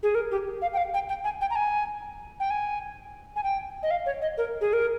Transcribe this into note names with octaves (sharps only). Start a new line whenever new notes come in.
G#4
A#4
G4
F5
G5
F5
G5
G5
G#5
G5
A#5
G#5
G5
G#5
G#5
G5
D#5
F5
C#5
D#5
A#4
G#4
A#4